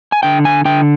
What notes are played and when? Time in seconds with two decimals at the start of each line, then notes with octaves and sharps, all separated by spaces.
0.12 G#5
0.23 D3 G5
0.45 G#5
0.65 D3 G5